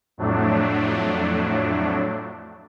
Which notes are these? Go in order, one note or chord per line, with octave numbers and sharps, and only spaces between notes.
F2 A2 F#3 A3 D4